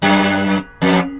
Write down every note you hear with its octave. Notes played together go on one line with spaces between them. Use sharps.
F#2
F2